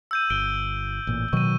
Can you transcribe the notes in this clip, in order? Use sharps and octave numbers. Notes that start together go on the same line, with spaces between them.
E6 G6 D#7
G1 D7 G7
A1 A#2
B2 D#3 F#3 C#6 D#7